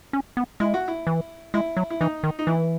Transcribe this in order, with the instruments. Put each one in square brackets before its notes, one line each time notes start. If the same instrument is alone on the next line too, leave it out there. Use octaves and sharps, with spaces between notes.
[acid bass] C#4
B3
[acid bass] G#3 [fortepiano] E4
[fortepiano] F#4
E4
[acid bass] E3
[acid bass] G#3 [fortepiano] E4
[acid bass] F#3
[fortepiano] E4
[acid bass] E3 [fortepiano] D#4
[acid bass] D#3
[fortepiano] D#4
[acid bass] E3 [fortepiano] E4